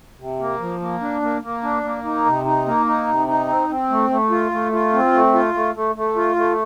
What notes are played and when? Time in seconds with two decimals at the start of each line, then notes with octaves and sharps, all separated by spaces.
0.19 C3
0.39 A#3
0.60 F3
0.81 A#3
1.01 D4
1.22 A#3
1.42 A#3
1.63 D4
1.84 A#3
2.04 D#4
2.25 C3
2.45 D#4
2.66 A#3
2.86 D#4
3.07 C3
3.27 D#4
3.49 C4
3.69 C4
3.90 A3
4.10 A3
4.30 F4
4.51 A3
4.72 F4
4.93 C4
5.13 A3
5.34 F4
5.54 A3
5.75 A3
5.95 A3
6.16 F4
6.36 A3